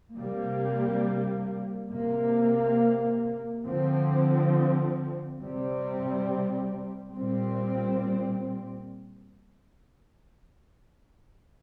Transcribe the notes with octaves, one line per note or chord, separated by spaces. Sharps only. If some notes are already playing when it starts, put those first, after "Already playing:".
C3 G3 A#3
C3 A#3
D3 F3 C4
C3 G3 C4
A#2 G3 C4